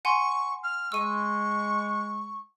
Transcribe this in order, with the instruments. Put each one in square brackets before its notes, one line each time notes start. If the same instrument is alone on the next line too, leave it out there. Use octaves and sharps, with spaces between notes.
[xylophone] F#5 G#5 C6 [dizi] C#6
[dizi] F6
[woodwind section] G#3 [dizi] C#6 [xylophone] E6 D#7